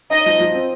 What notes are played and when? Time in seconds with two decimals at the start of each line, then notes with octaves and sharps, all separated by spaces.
0.11 D#4 D#5
0.26 F3
0.40 F3
0.54 C4